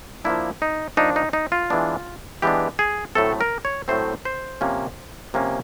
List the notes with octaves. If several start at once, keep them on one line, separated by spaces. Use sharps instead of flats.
F3 A#3 D4 E4
D#4
F3 A#3 D4 D#4
D#4
D#4
F4
E3 G#3 B3 D4
E3 G#3 B3 D4 G4
G#4
A2 F#3 A3 C4 A4
A#4
C#5
A2 F#3 A3 C4 C5
C5
C3 F3 A#3 C#4
C3 F3 A#3 C#4